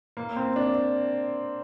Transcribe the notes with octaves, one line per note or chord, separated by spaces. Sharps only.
A#3
C4
D4